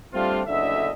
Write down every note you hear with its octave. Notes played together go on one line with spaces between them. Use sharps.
G3 A3 C4 D4 F4
F#1 D2 D3 D#5 E5